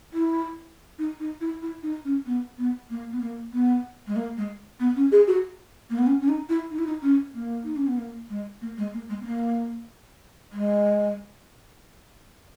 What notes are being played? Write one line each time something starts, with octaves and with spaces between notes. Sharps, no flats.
E4
D#4
D#4
E4
E4
D#4
C#4
B3
B3
A#3
B3
A#3
B3
G#3
A#3
G#3
B3
C#4
G#4
F#4
A#3
B3
C#4
C#4
D#4
E4
D#4
E4
D#4
C#4
A#3
D#4
C#4
B3
A#3
G#3
A#3
G#3
A#3
G#3
B3
A#3
G#3